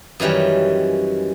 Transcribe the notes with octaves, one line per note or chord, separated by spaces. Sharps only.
F#2 D#3 E3 G3 C#4